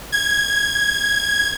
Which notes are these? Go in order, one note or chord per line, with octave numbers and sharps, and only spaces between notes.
G#6